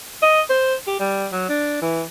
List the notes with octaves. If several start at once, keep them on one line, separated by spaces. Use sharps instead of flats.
D#5
C5
G4
G3
F#3
D4
E3